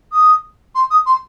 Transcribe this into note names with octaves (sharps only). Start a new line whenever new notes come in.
D#6
C6
D#6
C6